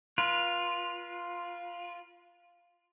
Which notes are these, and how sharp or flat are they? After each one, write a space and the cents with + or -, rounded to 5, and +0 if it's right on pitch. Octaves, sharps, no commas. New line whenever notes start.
F4 +0 B4 -35